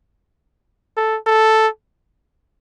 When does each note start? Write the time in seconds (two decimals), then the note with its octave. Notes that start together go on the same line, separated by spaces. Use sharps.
0.97 A4
1.26 A4